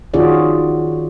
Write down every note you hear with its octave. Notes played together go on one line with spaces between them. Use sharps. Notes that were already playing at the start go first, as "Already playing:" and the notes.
D#3 C#4 F4 F#4 G#4 D5